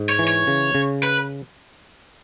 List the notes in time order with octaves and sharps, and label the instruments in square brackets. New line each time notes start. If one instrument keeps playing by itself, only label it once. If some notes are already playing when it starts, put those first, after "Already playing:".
Already playing: [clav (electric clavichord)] G#2
[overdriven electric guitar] C#5
[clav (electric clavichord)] E3
[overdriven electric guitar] C#5
[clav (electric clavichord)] C#3
C#3
[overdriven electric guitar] B4